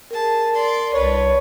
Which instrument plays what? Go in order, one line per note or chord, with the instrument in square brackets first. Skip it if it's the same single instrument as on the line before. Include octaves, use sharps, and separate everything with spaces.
[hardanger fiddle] G#4 A5 [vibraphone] A#4
[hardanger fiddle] D5 C6
[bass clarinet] C2 [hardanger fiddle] D4 B4 [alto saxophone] C#5